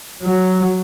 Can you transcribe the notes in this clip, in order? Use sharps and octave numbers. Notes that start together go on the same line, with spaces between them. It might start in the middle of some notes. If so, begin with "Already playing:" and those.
F#3